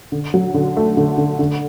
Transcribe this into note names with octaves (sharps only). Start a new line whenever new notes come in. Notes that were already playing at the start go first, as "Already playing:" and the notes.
D3
F#3
D3
A3
D3
D3
D3